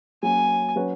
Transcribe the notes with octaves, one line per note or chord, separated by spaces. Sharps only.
F#3 A#3 C#4 G#5
F#3 C#4 F#4 B4